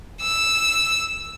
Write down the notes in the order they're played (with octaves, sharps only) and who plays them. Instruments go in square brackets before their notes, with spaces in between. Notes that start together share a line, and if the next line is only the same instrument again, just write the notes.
[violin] E6